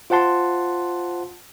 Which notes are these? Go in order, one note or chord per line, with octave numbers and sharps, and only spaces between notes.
F4 C5 F#5 A5 C6